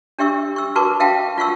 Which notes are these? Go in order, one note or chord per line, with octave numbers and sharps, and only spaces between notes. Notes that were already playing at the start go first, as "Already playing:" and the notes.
D4 G4 E5 C#6 E6
C#6 E6
F#4 A#4 B4 A5 C#6 D6
E5 F5 G5 A5
F4 F#5 C#6 E6